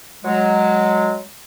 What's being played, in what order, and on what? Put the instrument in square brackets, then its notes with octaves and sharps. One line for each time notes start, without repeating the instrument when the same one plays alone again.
[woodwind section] F#3 G#3